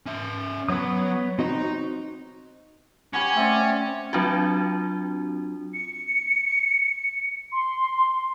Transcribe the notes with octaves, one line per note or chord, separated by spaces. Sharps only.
C#4 E5
F#3 B3 C#5 D#6
C4 D#4 F#4 D#5
C#4 F#4 G4 B4 G#5
A3 C4 D5
F#3 C4 D4 F4 F#4
C#7
C6